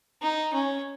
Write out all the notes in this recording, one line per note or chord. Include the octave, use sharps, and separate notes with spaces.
D#4
C#4